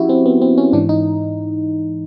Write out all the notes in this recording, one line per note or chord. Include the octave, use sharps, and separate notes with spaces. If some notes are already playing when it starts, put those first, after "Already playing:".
Already playing: F3 C#4 E4 F#4 G4
C4
B3
C4
C#4
G#2 E3 D4
D#4